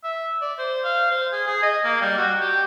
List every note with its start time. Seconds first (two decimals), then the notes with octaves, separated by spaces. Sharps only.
0.04 E5
0.41 D5
0.58 C5
0.84 F5
1.11 C5
1.32 G#4
1.47 G#4
1.63 D#5
1.84 A#3
2.01 G3
2.18 F#4
2.41 G4